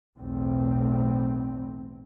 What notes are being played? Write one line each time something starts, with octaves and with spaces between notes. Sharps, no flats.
B1 E2 A2 C4